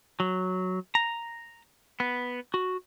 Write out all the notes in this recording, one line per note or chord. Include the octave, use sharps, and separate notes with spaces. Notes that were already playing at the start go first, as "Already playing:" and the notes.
F#3
A#5
B3
F#4